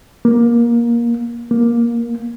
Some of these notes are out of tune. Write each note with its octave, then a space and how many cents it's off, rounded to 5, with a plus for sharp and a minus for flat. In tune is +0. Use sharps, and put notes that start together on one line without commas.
A#3 +20
A#3 +15